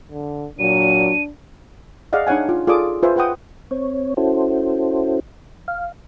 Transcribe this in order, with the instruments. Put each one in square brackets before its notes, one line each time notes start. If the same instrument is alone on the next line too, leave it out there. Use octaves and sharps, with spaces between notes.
[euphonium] D3
[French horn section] A#2 F#3 [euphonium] D4 [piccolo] D#7
[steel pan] G#4 D5 D#5 F5 F#5
D4 D#4 C#5 F#5 G#5
F4
F4 G#4 A4 D5 D6 D#6
F4 B4 C5 E5 G#5
F4 B4 F#5 G5 D#6
[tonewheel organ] C4 C#5
C#4 E4 F#4 A4 C5
F5